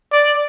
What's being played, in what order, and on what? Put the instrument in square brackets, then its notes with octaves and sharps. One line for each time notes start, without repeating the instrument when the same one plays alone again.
[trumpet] D5